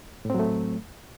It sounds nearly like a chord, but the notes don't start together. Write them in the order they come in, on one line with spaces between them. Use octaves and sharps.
A2 C4 F#3 A3